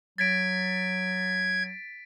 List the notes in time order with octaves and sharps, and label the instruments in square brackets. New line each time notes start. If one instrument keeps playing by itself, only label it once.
[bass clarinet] F#3 [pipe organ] G#6 [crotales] A6 B6 D7